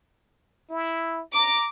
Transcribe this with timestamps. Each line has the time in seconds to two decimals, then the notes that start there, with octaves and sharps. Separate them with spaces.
0.70 E4
1.34 A#5 D6